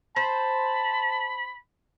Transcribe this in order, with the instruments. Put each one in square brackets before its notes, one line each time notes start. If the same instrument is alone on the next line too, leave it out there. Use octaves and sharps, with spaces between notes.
[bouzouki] C5 [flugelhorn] A5 [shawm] B5